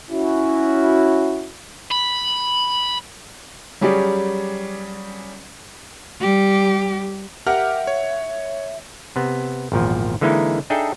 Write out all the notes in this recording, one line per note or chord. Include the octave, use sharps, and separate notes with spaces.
C#4 E4 F#4
B5
F#3 G3 C#4 G4 G#4 D5
G3 G4
G4 A#4 E5 F#5 F6
C#5
C3 B3
G#1 E2 A#2 F3
D3 E3 G#3 A#3 D#4 E4
D4 D#4 G#4 A4 E5 G5